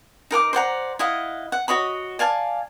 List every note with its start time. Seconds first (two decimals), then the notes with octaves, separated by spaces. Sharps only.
0.31 D#4 A#4 F#5 D6
0.53 C5 D5 F#5 A#5
0.99 E4 D#5 F5 F#5
1.52 F#5
1.68 F#4 C#5 D#5 B5
2.19 D5 F5 G#5 A5